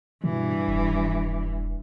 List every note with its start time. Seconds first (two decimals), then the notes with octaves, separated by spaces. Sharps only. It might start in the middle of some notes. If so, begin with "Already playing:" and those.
0.24 G2 B2 E3
0.68 E1